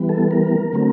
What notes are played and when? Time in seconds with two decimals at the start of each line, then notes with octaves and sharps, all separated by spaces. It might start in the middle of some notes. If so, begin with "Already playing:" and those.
Already playing: E3 G3 B3
0.09 A4
0.31 A#4
0.73 D3 F#3 A3 C4